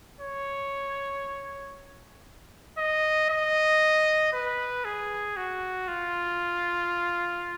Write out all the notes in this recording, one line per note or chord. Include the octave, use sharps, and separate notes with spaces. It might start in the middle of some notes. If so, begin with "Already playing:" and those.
C#5
D#5
D#5
B4
G#4
F#4
F4